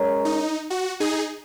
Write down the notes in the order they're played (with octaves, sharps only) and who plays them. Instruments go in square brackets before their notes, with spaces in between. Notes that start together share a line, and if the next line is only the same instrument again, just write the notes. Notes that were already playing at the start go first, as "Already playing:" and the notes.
Already playing: [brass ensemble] G#3 C#4 A#4 C#5
[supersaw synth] D#4
F#4
D#4 G#4